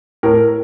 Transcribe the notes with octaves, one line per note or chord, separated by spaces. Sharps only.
A2 A#4